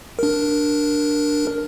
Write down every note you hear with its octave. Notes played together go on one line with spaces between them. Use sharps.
D4 A#4